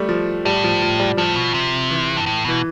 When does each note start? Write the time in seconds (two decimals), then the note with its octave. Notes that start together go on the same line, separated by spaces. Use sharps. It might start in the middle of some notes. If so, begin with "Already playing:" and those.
Already playing: G3 A3
0.09 F3
0.45 A2 G3
0.64 F3
0.82 F3
1.00 G3
1.17 A2 F3
1.35 B2
1.54 C3
1.91 E3
2.17 G2
2.26 A2
2.45 B2 E3